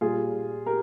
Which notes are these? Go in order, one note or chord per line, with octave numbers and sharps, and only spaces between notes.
A#2 G3 F4 G#4
G4 A#4